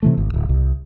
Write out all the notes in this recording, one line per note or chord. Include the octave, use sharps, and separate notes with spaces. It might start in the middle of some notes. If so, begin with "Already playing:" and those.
C3 E3 A3
G#1
D1
C2